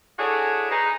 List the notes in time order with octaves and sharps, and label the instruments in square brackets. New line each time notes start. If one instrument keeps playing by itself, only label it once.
[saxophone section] D4 E4 F#4 G#4 A4 C#5
D#4 G#4 B4